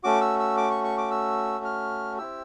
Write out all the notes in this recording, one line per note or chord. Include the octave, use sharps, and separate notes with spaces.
A3 C#4 F#4 D6
E6
E6
D6
C#6
C#6
D6
E6
F6
C4 E4 G4 E6